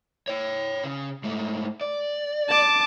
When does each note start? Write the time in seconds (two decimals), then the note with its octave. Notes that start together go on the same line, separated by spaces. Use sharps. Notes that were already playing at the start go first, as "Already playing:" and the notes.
0.28 C#5 G5
0.84 C#3
1.24 G#2 A3
1.81 D5
2.49 A5 D6